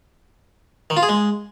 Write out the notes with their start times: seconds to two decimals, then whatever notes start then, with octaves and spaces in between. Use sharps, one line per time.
0.90 D#3
0.97 F4
1.03 G#4
1.09 G#3